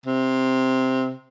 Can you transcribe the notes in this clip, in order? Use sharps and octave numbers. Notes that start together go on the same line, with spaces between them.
C3